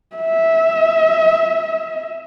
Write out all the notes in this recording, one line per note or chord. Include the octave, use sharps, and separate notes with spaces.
E5